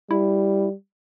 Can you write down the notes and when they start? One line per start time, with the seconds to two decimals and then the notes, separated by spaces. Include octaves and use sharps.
0.11 G3 E4